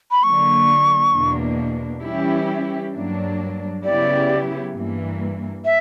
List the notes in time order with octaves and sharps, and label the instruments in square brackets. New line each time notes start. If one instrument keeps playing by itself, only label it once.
[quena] B5
[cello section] D3 F#3 A#3 [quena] C#6
[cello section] E2 B2 A#3 D4
E3 G3 C#4 E4 G4
G2 F#3 A#3 D4
[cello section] C#3 F#3 B3 E4 G4 [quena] D5
[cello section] G2 E3 A#3
[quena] E5